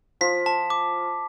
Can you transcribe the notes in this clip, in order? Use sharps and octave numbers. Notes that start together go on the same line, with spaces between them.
F3 F4 B6
A5
D6